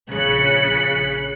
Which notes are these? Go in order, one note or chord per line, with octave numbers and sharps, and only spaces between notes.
A#1 C#3 F#6 B6 C#7